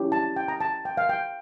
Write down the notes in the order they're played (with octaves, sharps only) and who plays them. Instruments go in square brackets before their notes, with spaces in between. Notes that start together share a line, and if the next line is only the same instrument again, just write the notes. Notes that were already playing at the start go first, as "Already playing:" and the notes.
Already playing: [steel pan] C#4 E4 G4
A5
G5
A#5
A5
G5
F5
G5